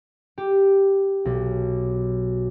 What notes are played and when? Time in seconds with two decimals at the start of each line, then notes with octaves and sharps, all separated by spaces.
0.38 G4
1.25 B1